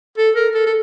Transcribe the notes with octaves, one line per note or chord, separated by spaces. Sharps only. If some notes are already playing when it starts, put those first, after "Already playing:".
A4
A#4
A4
A4